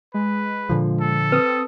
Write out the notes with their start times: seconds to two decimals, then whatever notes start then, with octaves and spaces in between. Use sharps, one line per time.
0.14 G#3 B4
0.69 A#2 D3 F3
1.00 A4
1.32 C4 B4 D#6